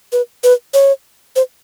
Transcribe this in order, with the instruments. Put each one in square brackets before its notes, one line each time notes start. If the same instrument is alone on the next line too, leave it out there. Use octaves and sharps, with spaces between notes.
[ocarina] B4
B4
C#5
C5